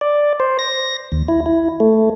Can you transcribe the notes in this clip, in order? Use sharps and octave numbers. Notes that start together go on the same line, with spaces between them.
D5
C5
A#6
D#2
E4
E4
A3